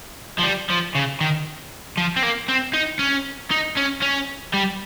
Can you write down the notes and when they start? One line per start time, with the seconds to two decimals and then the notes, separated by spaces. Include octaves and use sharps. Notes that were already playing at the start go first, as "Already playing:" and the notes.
0.39 F3
0.43 G3
0.70 F3
0.95 C#3
1.21 D#3
1.97 F3
2.16 C4
2.23 A#3
2.49 C4
2.74 D#4
2.99 C#4
3.51 D#4
3.77 C#4
4.02 C#4
4.53 G3